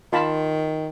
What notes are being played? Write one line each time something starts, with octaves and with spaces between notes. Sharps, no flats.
D#3 F4 A5 B5